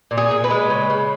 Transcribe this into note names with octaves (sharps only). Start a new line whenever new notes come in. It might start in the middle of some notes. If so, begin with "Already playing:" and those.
A#2
G#4
A#2
B4
G#3
C#3
C#3